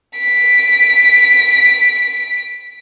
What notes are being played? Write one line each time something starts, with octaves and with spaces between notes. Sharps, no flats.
B6 D7